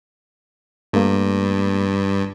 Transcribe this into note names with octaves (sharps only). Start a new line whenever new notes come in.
G2 A3 A#3